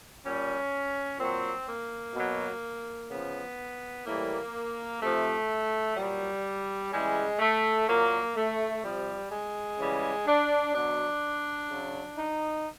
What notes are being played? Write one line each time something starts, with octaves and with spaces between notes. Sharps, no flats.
A#2 G3 C#4
A#2 F#3 C4
A#3
B2 F#3
C#3 F3 B3
A2 E3 G3 A#3
C3 F3 A3
A#2 F#3 G3
C#3 E3 G3 G#3
A3
A#2 F#3 A#3
A3
C3 F3 G3
G#3
C#3 E3 G3
D4
B2 F#3 D4
C#3 F#3
D#4